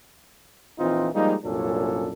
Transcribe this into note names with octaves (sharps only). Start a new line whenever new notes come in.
A#1 E3 C4 D#4 F4
F3 G3 G#3 A#3 D#4
C2 F#2 A#2 C#4 D4 A4